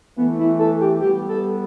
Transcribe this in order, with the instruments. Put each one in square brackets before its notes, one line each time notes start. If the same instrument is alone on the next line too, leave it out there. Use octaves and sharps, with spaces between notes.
[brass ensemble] E3 A3 [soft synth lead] B3
[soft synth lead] E4
A4
G4
[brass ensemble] G3 B3 [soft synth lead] G4
[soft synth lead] A4